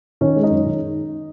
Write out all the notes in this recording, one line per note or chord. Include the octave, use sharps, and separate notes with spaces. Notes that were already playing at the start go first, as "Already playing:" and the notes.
D#3 C#4
G#3
D#4
F#2
D#3